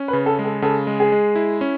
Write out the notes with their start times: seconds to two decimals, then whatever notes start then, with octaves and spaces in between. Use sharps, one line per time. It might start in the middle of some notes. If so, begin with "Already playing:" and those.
Already playing: C#4
0.08 B4
0.13 C#3
0.26 A4
0.39 G#3
0.44 A4
0.62 C#3 A4
0.87 G#3
1.00 G#4
1.12 G#3
1.35 E4
1.61 C#4